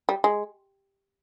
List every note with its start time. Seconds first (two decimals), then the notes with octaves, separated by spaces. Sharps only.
0.09 G3
0.24 G#3